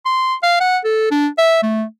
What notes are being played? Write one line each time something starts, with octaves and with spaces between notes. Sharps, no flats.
C6
F5
F#5
A4
D4
E5
A3